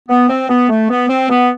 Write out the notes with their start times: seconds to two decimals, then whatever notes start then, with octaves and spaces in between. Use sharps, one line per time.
0.09 B3
0.29 C4
0.49 B3
0.69 A3
0.89 B3
1.09 C4
1.29 B3